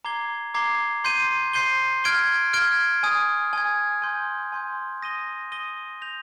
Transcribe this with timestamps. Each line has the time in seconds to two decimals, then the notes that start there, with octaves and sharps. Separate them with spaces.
0.05 A#5 D6 G#6 C7 G7
0.54 A#5 D6 G#6 C7 G7
1.04 C6 G6 C7 D#7 G7
1.53 C6 G6 C7 D#7 G7
2.04 F6 G#6 D7 G7
2.53 F6 G#6 D7 G7
3.03 G#5 D#6 G#6
3.53 G#5 D#6 G#6
4.02 G#5 C6 G6
4.52 G#5 C6 G6
5.02 D#6 A#6 D#7 G7
5.52 D#6 A#6 D#7 G7
6.02 G6 A#6 F7